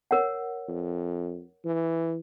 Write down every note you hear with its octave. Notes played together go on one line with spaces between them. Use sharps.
A#4 C#5 F#5
F2
E3